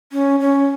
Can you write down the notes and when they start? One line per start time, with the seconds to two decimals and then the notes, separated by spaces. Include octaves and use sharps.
0.12 C#4
0.40 C#4